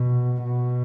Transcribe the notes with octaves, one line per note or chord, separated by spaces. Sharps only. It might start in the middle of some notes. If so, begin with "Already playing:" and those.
Already playing: B2
B2